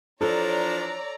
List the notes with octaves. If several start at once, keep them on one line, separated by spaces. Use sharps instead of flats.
E3 F3 D4 A4 C#5 D5 A#5